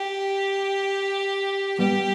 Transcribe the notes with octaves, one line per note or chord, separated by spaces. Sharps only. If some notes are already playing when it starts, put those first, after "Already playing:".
Already playing: G4
G3 B3 G4